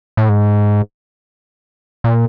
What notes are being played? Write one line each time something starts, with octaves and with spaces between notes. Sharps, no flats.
A2
G#2
A#2